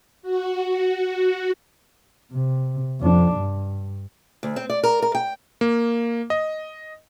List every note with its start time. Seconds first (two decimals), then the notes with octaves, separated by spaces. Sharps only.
0.22 F#4
2.33 C3
3.01 F2 D4
3.35 G2
4.43 D2
4.56 C4
4.70 D5
4.83 A#4
5.02 A#4
5.15 G5
5.61 A#3
6.30 D#5